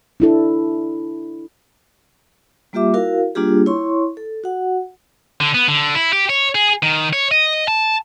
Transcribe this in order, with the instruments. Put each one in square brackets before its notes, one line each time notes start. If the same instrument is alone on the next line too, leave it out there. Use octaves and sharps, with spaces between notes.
[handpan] D4 E4 A4
[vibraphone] G3 A#3 F4 G4 E5 D6
E4 F#4 A#4 F5
G3 A#3 D4 F4 G4 G#4
E4 C#5 C6 C#6
A4
F#4 F#5
[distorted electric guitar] D3
B3
D3
E4
G4
C#5
G#4
D#3
C#5
D#5
A5